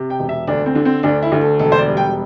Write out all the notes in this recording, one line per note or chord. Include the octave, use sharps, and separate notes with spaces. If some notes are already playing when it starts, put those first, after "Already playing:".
Already playing: C3
G5
E1
E5
D2 D4
C4
D3
C4
D2 D4
E4
D2
A4
E1 A4
C5
D5
G3
G5